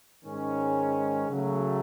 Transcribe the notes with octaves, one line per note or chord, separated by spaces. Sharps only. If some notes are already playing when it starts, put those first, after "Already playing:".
G#2 D#3 G#3 C#4
C#3 F#3 A3